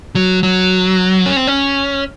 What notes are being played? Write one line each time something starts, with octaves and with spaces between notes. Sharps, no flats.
F#3
F#3
C#4
C4
C#4